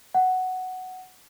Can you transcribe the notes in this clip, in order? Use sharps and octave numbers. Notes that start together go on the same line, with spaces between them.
F#5